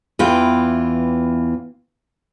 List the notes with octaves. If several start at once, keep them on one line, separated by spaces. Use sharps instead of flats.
E2 E3 F4 G5